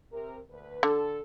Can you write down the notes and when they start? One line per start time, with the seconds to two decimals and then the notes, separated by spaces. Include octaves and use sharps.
0.13 C3 A#4
0.50 D2 B4
0.83 D3 A4